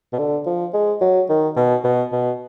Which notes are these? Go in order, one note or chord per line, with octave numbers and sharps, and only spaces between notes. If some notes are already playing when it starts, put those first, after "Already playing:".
B2
D3
F3
G#3
F#3
D#3
B2
B2
B2